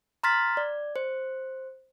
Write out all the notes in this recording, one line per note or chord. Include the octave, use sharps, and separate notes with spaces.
A#5 C6 F6 A6 B6
D5
C5